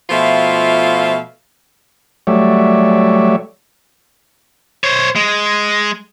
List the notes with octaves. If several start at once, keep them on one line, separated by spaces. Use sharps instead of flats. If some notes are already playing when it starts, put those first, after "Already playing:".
B2 F3 A3 F4 E5 F5
F#3 G3 A3 C#5 D5 E5
C5 C#5
G#3